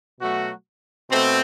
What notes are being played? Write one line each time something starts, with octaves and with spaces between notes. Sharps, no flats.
B2 F#3 A3 F#4
B2 A3 C4